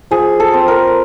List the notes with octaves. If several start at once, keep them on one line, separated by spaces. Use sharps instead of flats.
F3 G#4
A4
C4
A#4